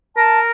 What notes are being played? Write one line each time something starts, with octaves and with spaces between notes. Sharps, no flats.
A#4 A5